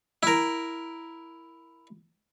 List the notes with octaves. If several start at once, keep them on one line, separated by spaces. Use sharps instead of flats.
E4 A#4